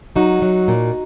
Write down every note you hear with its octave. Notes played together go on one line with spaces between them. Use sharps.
F#3 D#4 F#4
F#3
A#2